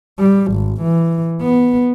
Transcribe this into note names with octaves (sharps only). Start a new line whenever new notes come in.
G3
G#1
E3
B3